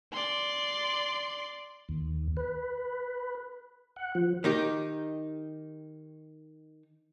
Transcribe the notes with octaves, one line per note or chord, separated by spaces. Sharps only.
D5 C6
D#2
B4
F#5
F3
D#3 D#4 G4